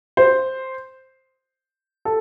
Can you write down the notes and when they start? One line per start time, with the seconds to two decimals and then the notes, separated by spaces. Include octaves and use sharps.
0.17 C5
2.05 A4